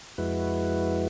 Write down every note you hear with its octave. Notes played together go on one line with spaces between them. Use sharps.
F2 G#3 E4 F#4 B4